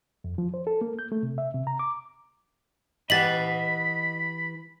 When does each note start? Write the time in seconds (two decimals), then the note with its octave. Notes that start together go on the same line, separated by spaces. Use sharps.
0.24 F2
0.38 F3
0.54 C5
0.67 A4
0.81 A#3
0.99 G6
1.12 A3
1.23 C3
1.38 E5
1.54 C3
1.67 A#5
1.79 D6
3.10 E3 G4 D#5 F#5 B5 A6 B6 F#7